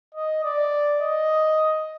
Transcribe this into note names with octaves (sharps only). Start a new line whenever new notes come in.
D#5
D5
D#5